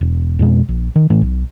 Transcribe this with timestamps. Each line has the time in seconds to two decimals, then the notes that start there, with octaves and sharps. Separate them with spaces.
0.01 E1
0.39 F2 B2 G#3
0.69 A#1
0.96 D#3
1.10 A2 E3 A3
1.22 B1